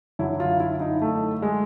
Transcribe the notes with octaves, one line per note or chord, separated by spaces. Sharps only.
F#2 D3 F#3 E4
F4
E4
D#4
A3
G#3